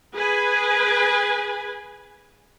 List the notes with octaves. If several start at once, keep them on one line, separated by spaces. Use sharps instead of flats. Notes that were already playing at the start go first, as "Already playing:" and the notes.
G#4 B4 G#5